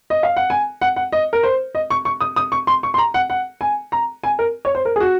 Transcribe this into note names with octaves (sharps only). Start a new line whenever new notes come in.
D#5
F5
F#5
G#5
F#5
F#5
D#5
A#4
C5
D#5
C#6
C#6
D#6
D#6
C#6
C6
C#6
C6
A#5
F#5
F#5
G#5
A#5
G#5
A#4
C#5
C5
A#4
G#4
F#4